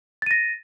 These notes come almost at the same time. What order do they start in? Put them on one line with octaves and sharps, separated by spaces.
A6 D#7 A#6